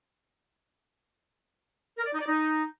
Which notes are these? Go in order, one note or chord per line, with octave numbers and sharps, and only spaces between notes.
A#4
D5
D#4
D5
D#4